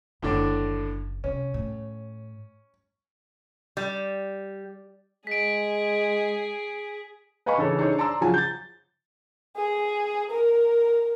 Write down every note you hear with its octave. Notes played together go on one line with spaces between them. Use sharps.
F#1 A2 D3 D4
C3 C#4
A2
G3
G#3 G#4 B6 D7
B4 D#5 F5 G#5 B5 C#6
C#3 E3 C#4 A4 C#5
D4 D#4 G#4 A4 C5 C#5
D5 A5 A#5 C6 E6
C#3 F3 F#3 F4 G#5 A5
G6 A6
G#4
A#4